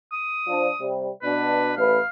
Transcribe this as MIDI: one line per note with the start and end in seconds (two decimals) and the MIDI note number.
0.13 0.86 87
0.47 0.67 53
0.47 0.67 62
0.80 1.09 48
0.80 1.09 55
1.23 1.71 47
1.23 1.71 62
1.23 1.77 71
1.77 1.98 33
1.77 1.98 57
1.77 1.98 71
1.77 2.09 77